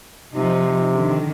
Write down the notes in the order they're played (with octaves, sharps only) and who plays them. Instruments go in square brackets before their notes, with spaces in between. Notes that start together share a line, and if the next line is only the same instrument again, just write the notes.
[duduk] C3 [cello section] F3 D#4
[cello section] D3 D#3